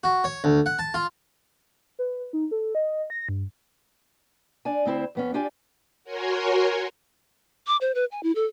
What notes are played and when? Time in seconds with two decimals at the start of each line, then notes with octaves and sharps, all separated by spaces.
0.04 F#4
0.24 C#5
0.44 D2
0.66 F#5
0.79 A5
0.94 F4
1.99 B4
2.33 D#4
2.51 A4
2.75 D#5
3.10 A#6
3.29 G2
4.65 D4 D5 G#5
4.85 D2 C4 E4 C5
5.15 F2 B3 C#4
5.34 D4 F4 G4 D5 G#5
6.04 F#4 A#4 C#5 G#5 C6
7.67 D6
7.81 C5
7.95 B4
8.12 G#5
8.23 E4
8.35 A4